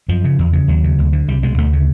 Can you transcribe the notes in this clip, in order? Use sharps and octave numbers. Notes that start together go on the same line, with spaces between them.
F#2 F3
C#3
E2
C#3
D#2 F#3
C#3
D2
D3
C2 G3
B2 G#3
D2 A3
C#3